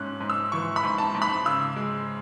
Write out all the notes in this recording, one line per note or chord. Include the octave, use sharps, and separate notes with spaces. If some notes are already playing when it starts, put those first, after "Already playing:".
Already playing: G#2 C#4 F#6
G#2
E6
E3 C#6
B5
G#2
A5
G#2
B5
C#3 E6
G#3